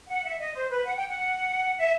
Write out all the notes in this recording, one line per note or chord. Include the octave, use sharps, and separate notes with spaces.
F#5
E5
D#5
C5
B4
F#5
G5
F#5
E5